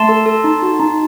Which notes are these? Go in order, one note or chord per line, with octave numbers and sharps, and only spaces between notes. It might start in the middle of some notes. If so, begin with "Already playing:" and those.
Already playing: A3 A5 C6
A4
A4
D#4
F#4
D#4